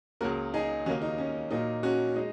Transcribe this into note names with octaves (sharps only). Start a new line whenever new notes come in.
C#2 C#3 F#3 A#3 F#4 A#4
D#4 G#4
D#2 C#3 A#3 C#4 F#4
D#4
C#4
A#2 F#3 A#3 D#4
C#4 F#4
G#3 D#4